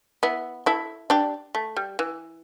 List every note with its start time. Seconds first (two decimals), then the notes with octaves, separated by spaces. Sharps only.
0.23 B3 E4
0.66 E4 A4
1.10 D4 G4
1.55 A3
1.77 G3
1.99 E3